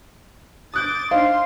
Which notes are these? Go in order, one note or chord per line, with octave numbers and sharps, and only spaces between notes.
D6 D#6 F#6 G6 A6
D4 D#4 C5 F5 C6